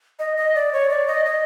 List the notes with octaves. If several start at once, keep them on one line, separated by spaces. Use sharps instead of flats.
D#5
D#5
D5
C#5
D5
D#5
D#5